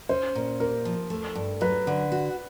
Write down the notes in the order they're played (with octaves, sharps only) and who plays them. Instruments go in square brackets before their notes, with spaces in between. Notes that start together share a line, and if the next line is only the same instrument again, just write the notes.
[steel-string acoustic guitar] C#4 [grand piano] C5
[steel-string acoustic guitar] A#2
[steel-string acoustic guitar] A#3 [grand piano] A#4
[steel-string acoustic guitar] F3
A3
G2
[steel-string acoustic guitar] F#3 [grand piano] B4
[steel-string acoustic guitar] D3
F#4